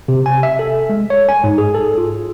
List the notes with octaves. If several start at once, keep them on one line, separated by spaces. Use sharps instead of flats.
C3
G#5
E5
A4
G#3
C#5
G#5
G#2
G#4
A4
F4